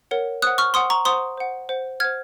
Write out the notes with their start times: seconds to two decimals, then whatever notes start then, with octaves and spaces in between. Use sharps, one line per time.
0.11 A#4 C#5 F#5
0.42 C5 F#5 D#6 F#6
0.58 C#6 F6
0.74 C5 F#5 C6 D#6
0.90 A#5 C#6
1.05 C5 F#5 C6 D#6
1.37 C5 F#5
1.69 C5 F#5
2.00 C5 F#5 F6 G#6